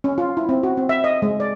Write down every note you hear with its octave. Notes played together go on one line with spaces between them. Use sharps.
C#4
F4
E4
C4
F#4
C4
E5
D#5
G#3
D5